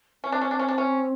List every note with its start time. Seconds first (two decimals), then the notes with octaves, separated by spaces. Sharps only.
0.23 C4 C#4
0.32 D4
0.41 C#4
0.51 D4
0.59 C#4
0.68 D4
0.78 C#4